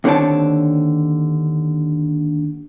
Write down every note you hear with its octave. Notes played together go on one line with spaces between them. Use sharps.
D#2 D3 C4 C#5 G5 A5